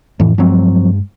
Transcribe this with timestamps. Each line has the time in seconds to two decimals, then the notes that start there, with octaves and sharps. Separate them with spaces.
0.20 F2 A2 E3
0.38 G2 F3 F#3 G#3 A3 C4